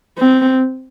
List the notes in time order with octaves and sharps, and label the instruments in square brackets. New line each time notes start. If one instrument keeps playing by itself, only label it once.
[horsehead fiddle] C4